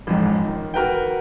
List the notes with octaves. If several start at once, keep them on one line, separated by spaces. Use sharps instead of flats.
A1 F2 G#2
D#3
F#4 A#4 B4 G5